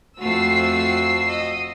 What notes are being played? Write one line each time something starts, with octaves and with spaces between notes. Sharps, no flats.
F2 A3 F#4 E6 C7
D#5